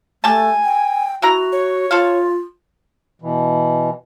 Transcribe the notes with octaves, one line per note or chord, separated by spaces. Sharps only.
A3 G4 G#5 A5
G5
C3 E4 F#4 A#5
C#5
F4 A4 C5 F5
B2 E3